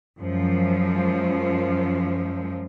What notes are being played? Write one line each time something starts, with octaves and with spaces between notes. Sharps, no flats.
F#2 F3 G#3